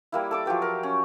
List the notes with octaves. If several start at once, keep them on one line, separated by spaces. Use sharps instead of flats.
G3 A#3 E4
A4 D5 D6
F3 F#3 G4 B4
A#4
C#4